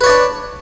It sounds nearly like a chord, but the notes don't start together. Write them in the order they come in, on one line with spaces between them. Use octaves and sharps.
B4 C#5 D5 D4